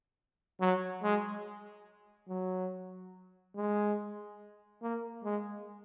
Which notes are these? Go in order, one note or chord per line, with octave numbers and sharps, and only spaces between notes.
F#3
G#3
F#3
G#3
A#3
G#3